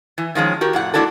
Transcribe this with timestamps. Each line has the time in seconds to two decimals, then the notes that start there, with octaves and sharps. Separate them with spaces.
0.18 E3
0.35 D#3 F3 G#3 C#4
0.61 F#4 G4 A#4
0.73 F2 A2 F#5
0.94 G#3 A#3 D4 E4 F#4 A4